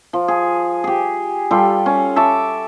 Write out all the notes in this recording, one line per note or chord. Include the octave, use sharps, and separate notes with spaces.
F3
G#4
G4 G#4
G3 F4 A4
C#4
E5 A5 C#6 D6